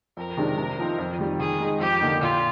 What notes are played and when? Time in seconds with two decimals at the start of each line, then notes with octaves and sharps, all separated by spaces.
0.17 F2 A#4
0.37 C3 D#3 G#3 D4
0.58 C3
0.79 F3 C4 D#4
0.98 F2
1.19 D#3 G3
1.39 D#3 G#4
1.60 G#3 D#4
1.80 F2 G4
2.01 D3 F3 A#3 D#4
2.21 A#2 F4